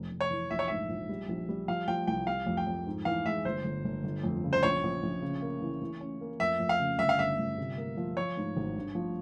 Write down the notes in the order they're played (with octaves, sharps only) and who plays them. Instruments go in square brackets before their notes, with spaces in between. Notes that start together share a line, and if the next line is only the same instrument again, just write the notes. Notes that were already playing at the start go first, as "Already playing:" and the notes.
Already playing: [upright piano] F1
F1
[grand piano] C#5
[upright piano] E3
[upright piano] A#1 [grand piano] E5
[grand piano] C#5
[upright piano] G#2 [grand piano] E5
[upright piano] A#1
G3
A#1
G3
[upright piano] F3 [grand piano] F5
[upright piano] F3 [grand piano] G5
[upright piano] C2 [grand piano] G5
[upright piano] G3 [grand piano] F5
[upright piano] F2
[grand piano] G5
[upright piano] F2
G#2
[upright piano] E3 [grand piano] F5
[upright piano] G#3 [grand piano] E5
[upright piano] G1 [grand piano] C5
[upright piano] G1
G1
G1
F2
C#3
[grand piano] C5
[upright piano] A#1 [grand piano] C#5
[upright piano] A#1
A#1
C#3
A#3
E3
E3
C#4
A#3
[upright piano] F2 [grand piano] E5
[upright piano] F2
[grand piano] F5
[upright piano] C#3
[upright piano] G1 [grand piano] E5
[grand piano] F5
[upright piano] G1 [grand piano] E5
[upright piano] G1
C3
A#3
F3
[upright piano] F3 [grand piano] C#5
[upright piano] G#2
G#1
G2
F3